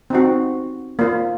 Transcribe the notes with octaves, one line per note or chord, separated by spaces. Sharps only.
C4 D#4 F#4
A#3 F4